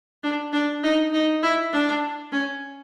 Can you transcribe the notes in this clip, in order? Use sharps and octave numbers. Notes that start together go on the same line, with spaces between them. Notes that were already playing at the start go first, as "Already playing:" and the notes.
D4
D4
D#4
D#4
E4
D4
C#4